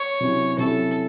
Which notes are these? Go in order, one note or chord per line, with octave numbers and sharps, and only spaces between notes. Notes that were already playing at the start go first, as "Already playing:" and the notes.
Already playing: C#5
C3 F#3 C#4 E4
C3 F#3 C#4 E4 A4